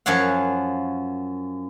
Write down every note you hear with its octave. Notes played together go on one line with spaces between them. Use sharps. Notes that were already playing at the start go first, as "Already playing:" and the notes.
F#2 F3 C#5 F5 F#5